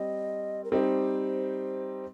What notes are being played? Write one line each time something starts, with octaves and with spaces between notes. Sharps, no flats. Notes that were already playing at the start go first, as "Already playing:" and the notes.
Already playing: G3 C4 D#5
A#4
G3 C4 D#4 G4 C5